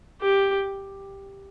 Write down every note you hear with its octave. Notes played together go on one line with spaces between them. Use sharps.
G4